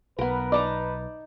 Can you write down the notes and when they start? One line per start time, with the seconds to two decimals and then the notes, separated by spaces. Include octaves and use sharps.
0.19 B1 B3 A#4 B4
0.52 D#4 D5 A5 A#5